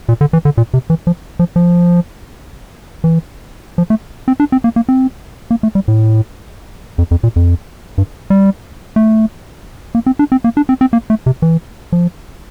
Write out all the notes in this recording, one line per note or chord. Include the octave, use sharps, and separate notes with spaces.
A#2
D3
E3
D3
A#2
C3
E3
F3
F3
F3
E3
F3
A3
C4
D4
C4
A#3
A#3
C4
A#3
A3
G3
A2
F2
F2
A#2
F2
G2
G3
A3
A#3
C4
D4
C4
A#3
D4
C4
C4
A#3
A3
C3
E3
F3